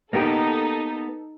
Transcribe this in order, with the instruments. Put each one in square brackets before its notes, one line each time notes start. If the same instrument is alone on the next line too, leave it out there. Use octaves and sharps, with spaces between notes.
[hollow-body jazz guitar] A#3 B3 G4 [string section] D#4 A4